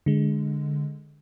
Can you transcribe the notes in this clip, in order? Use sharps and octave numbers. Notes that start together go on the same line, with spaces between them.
D3 G#3